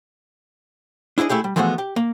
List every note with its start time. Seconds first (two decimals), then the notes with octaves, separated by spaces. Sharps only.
1.18 D4 E4 G#4 C5 D#5
1.29 A3 E4 G4 G#4
1.44 G3
1.56 E3 F3 G#3 A3 B3 F#4
1.78 G4
1.96 A#3